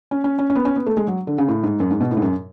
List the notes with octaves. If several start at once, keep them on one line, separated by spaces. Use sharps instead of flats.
C#4
C#4
C#4
C#4
B3
C#4
B3
A3
G#3
F#3
D3
C#3
A2
G#2
F#2
G#2
B2
A2
G#2
F#2